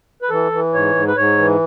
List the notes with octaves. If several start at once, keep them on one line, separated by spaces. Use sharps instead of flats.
B4
E3 A4
E3
G#2 C#5
G#2
B4
G#2 C#5
E3